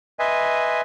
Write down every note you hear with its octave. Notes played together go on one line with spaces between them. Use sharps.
B4 D#5 E5 G#5 C6